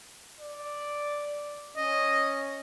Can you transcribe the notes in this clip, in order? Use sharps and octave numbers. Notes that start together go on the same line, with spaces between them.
D5
C#4 D#5